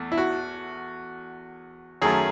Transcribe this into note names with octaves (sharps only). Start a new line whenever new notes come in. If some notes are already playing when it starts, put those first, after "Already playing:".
Already playing: E2 A3
E4
F#4
F#2 D#3 A3 G#4